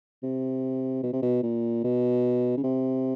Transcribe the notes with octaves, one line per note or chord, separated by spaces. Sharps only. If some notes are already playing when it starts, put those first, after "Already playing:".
C3
B2
C3
B2
A#2
B2
C#3
C3